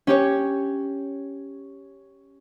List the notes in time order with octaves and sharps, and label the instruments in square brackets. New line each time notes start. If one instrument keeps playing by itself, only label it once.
[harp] C#4 G4 C#5